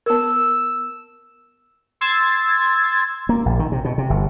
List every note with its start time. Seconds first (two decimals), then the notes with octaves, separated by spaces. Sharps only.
0.06 B3 A#4 E6
2.01 C6 E6 G#6 A6
3.29 A#3
3.46 A#1
3.59 D#3
3.72 C3
3.85 B2
3.98 C3
4.10 G1